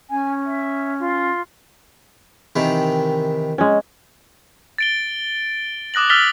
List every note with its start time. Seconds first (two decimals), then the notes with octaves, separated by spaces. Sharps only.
0.10 C#4 G#5
0.45 E5
0.99 F4
2.56 C3 D#3 E3
3.58 G#3 C#4
4.78 A6 D7 G7
5.94 D6 D#6 F#6 A#6 F#7
6.10 E6 F6 A6 B6 F7 G7